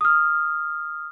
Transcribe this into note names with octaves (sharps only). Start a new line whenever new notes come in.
D#6 F6